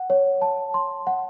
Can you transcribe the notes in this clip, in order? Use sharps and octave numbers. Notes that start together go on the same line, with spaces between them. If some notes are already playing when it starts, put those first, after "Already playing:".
Already playing: F#5
C#5
A5
C6
F#5